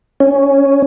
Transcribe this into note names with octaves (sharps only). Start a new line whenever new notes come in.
C#4